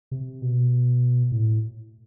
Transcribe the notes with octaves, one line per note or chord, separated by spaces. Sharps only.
C3
B2
A2